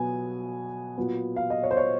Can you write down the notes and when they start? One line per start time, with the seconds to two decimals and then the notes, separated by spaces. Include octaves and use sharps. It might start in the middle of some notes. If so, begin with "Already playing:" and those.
Already playing: B2 F#3 B3 G#5
0.98 A#2 F#3 B3
1.36 F5
1.50 D#5
1.63 C#5
1.71 C5
1.77 C#5